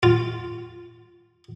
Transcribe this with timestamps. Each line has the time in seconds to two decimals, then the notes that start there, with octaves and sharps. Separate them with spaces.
0.03 F4